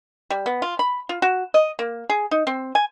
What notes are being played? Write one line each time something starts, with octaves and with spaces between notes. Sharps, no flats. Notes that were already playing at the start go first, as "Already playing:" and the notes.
G3
B3
F4
B5
F4
F#4
D#5
A#3
G#4
D#4
C4
G#5